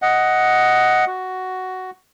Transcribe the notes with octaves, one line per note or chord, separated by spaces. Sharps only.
D#5 F#5
F#4